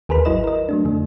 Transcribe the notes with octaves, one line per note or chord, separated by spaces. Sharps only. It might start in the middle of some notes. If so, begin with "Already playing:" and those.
D#2 G#4 A#4 B4 B5
G#1 F#3 E4 B4 D#5 E7
A#4 D#5
F#3 A3 D4
F2 D3 A3